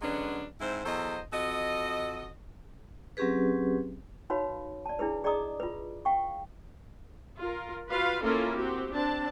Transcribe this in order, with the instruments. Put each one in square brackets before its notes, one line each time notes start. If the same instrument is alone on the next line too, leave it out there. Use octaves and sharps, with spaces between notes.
[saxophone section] D3 F#3 G#3 B3 C#4 D4
G#2 C4 E4 C5
E2 F#3 A4 C5 D#5
F2 F#4 A4 D#5
[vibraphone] F#3 C4 C#4 G4 G#4 B4
[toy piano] D#4 F#4 B4 C#5 F5 B5
D5 A5
D4 E4 G#4 B4
G#4 D5 D#5 A#5 D6 D#6
F4 B4
F5 G5 C#6
[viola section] F4 A#4
F4 F#4 B4 F5
A#3 C#4 E4 F4 A4 A#4
C4 F#4 G4
C4 D4 A5